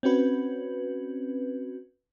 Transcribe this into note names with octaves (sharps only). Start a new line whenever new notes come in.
C4 C#4 F#4 B4